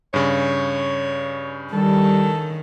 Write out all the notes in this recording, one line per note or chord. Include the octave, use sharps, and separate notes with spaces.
G2 C#3 C#5
D#3 G3 A4